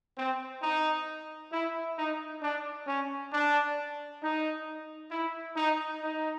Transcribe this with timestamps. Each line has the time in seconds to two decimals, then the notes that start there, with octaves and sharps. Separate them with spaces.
0.17 C4
0.62 D#4
1.51 E4
1.98 D#4
2.41 D4
2.87 C#4
3.32 D4
4.22 D#4
5.11 E4
5.56 D#4
6.01 D#4